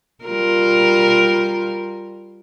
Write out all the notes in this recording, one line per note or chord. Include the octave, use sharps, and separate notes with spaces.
G3 F4 A#4